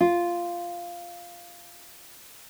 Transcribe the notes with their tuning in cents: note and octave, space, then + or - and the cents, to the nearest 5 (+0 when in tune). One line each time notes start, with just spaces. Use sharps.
F4 -5